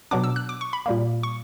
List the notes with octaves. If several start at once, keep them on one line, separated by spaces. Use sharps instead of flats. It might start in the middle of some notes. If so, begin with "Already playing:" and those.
B2 F#3 B3 D4 D6
E6
F#6
D6
C#6
B5
A#2 G3 A#3
C#6